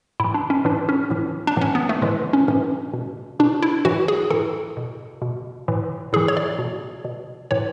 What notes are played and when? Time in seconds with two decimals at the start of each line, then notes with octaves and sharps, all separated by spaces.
0.20 A2 E3 E4
0.34 D4
0.50 C#4
0.65 A2 E3 D4
0.89 C#4
1.10 A2 E3
1.47 D4
1.57 A2 E3 C#4
1.75 B3
1.89 A3
2.02 A2 E3 G#3
2.33 C#4
2.48 A2 E3 C#4
2.93 B2
3.39 B2 D4
3.62 E4
3.85 A2 E3 F#4
4.08 G#4
4.30 A2 E3 A4
4.77 B2
5.22 B2
5.68 A2 E3
6.13 A2 G#4
6.16 E3
6.28 C#5
6.37 D5
6.59 B2
7.05 B2
7.51 A2 E3 C#5